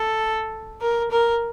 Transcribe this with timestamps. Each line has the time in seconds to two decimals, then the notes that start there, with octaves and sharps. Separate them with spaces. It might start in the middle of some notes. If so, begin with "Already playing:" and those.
Already playing: A4
0.81 A#4
1.11 A#4